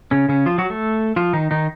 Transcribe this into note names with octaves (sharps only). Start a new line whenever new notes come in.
C#3 C#4
C#3 C#4
F3 F4
F#3 F#4
A3 A4
F3 F4
D#3 D#4
D#3 D#4